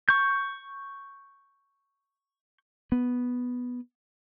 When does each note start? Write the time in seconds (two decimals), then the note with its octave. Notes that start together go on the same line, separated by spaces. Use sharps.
0.09 C#6 G6
2.92 B3